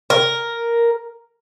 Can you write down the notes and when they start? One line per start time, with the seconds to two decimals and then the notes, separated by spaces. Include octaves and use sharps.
0.10 A#4